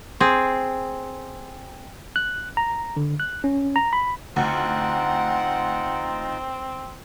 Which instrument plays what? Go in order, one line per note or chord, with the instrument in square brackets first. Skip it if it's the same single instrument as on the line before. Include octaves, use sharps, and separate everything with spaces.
[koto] C4 G#4
[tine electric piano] F#6
A#5
D3
F#6
C#4
A#5
B5
[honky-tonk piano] D2 [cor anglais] C4 [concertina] D#4 F4 A#5 [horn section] F#5